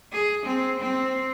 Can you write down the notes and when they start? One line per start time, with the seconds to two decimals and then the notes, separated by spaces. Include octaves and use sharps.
0.13 G#4
0.46 C4
0.80 C4